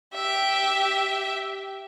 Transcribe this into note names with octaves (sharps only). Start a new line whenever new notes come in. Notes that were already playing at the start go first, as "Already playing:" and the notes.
G4 E5